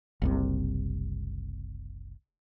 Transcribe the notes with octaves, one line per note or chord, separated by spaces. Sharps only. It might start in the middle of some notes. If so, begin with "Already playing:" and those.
F#1 C2 C3